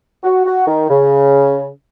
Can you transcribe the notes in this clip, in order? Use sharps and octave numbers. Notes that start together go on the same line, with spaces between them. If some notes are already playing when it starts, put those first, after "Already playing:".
F#4
F#4
D#3
C#3